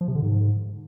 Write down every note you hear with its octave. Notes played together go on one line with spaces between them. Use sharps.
F3
C3
D3
G#2